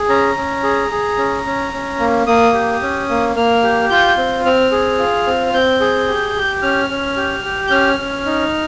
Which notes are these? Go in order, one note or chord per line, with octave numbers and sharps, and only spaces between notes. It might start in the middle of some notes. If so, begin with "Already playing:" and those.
Already playing: G#4
C#4 A#5
C#4
G#4
G#4
C#4
C#4
C#4
A#3
A#3 D#6
G4
C#4
A#3
A#3 F6
G4
F4 G6
C4
C4 F6
G#4
F4
C4
F6
C4 G6
G#4
G4
G4
C#4 F6
C#4
G4
G4
G6
C#4 F6
C#4
D#4